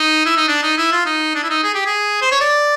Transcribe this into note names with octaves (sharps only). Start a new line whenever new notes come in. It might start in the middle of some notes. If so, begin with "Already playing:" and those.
Already playing: D#4
E4
D#4
D4
D#4
E4
F4
D#4
D4
E4
D#4
G#4
G4
G#4
C5
C#5
D5